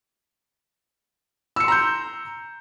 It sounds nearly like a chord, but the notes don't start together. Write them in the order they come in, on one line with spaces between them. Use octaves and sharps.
E6 C#7 C6 A#5 G6